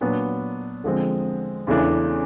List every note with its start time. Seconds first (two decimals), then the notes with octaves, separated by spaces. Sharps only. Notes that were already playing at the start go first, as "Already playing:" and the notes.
0.01 A#2 F#3 B3 D4
0.84 D3 F3 G#3 C4
1.67 E2 C#3 E3 A3 D4